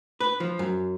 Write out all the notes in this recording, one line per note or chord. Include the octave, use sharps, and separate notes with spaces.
B4
F3
F#2